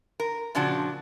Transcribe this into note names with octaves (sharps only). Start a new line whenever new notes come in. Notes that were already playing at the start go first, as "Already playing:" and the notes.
A#4
A#2 C#3 F3 D4 F#4